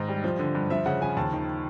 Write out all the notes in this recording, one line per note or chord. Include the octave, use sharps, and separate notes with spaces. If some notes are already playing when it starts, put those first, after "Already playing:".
Already playing: G#2 D#3 D#5
G3
F3
D3
G2
F3 E5
C#3 F#5
F3 G#5
D#2 A5
D#3